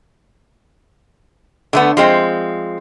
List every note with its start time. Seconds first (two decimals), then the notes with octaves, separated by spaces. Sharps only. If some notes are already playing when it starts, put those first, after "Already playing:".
1.73 D3 A3 B3
1.97 F3 G#3 C4